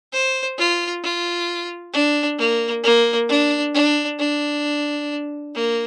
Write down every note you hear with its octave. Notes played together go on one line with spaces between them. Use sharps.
C5
F4
F4
D4
A#3
A#3
D4
D4
D4
A#3